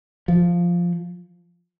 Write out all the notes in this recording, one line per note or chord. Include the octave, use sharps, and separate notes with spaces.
F3